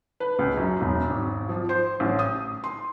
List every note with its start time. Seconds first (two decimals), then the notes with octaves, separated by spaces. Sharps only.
0.20 B4
0.39 C#2
0.57 F#2
0.81 E1
1.10 G#1
1.49 F3
1.69 C5
2.00 A1
2.19 D#6
2.64 C6